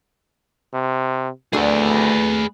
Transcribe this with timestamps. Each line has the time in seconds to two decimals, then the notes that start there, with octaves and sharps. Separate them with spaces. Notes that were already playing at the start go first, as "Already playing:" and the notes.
0.74 C3
1.53 D2 A3 D4 F#4 G#4 B4